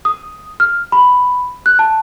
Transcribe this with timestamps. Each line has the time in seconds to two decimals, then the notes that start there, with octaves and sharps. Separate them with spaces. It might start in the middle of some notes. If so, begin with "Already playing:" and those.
0.05 D#6
0.60 F6
0.92 B5
1.66 F#6
1.79 A5